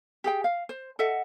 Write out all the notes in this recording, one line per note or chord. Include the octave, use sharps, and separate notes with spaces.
G4 G#4 G5
F5
C5
A4 D#5 E5 F#5